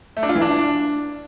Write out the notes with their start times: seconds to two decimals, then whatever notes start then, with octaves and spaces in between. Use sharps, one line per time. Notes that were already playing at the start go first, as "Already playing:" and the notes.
0.17 A3
0.23 D4
0.29 F4
0.35 E3
0.42 D4